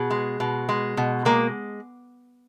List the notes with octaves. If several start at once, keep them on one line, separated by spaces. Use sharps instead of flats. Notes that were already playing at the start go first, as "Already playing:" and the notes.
Already playing: B2 G#4
G#3
B2
G#3
B2
G#3 A#3